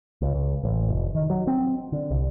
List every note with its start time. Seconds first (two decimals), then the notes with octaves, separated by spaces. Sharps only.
0.22 C#2
0.34 C#2
0.63 A1
0.89 F1
1.15 D#3
1.30 F#3
1.47 C4
1.92 D3
2.11 C2